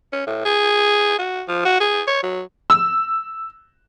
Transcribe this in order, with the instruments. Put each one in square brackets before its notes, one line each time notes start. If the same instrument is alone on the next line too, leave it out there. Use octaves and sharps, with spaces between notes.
[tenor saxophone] C#4
A2
G#4
F#4
F3
F#4
G#4
C#5
F#3
[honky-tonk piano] E6